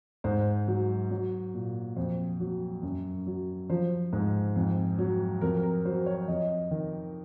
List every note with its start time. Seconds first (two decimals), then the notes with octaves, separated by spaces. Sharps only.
0.24 G#2 C5
0.67 F#3
1.11 F#3
1.54 A#2
1.96 F2 C5
2.40 F#3
2.83 F#2
3.27 F#3
3.70 F3 C5
4.13 G#2
4.56 F2
4.98 F#3
5.41 F2 A#4
5.63 A#4
5.85 F#3 C5
6.06 C#5
6.28 F2 D#5
6.71 D#3